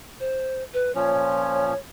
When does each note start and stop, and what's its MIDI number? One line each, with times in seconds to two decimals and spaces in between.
0.20 0.63 72
0.74 0.92 71
0.95 1.74 46
0.95 1.74 53
0.95 1.74 61
0.95 1.77 73